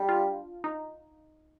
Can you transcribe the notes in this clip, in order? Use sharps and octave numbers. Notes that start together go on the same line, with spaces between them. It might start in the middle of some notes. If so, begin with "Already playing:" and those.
Already playing: G3 D4
F4
D#4